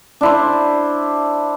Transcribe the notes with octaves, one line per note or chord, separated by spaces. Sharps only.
D4 E4 C5